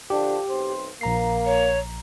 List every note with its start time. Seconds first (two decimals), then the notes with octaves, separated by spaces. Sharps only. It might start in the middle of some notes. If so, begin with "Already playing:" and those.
0.10 D3 F3 D4 G4
0.49 B1 C4 C5
1.01 A#1 A#3 A#5 C7
1.46 C#5